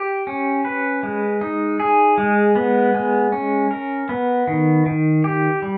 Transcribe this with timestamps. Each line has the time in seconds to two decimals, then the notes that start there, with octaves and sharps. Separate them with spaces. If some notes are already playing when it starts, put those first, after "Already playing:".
Already playing: G4
0.27 C#4
0.65 B4
1.03 G#3
1.41 D#4
1.80 G#4
2.18 G#3
2.55 B3
2.94 G#3
3.32 C#4
3.71 A#4
4.09 B3
4.47 D#3
4.86 D#3
5.24 G4
5.62 G3